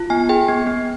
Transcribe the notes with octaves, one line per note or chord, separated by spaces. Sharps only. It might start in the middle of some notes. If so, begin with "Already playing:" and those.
Already playing: F4
B3 G#5
G#4 G5
B3
B3